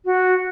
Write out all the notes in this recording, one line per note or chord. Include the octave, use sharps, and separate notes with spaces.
F#4